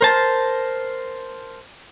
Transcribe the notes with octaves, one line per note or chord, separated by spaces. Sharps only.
A#4 C5 A5